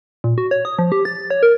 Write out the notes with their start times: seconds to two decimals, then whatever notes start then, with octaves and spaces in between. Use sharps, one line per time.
0.24 A#2
0.38 F#4
0.51 C#5
0.65 D#6
0.79 F3
0.92 G4
1.05 A6
1.31 C#5
1.43 A#4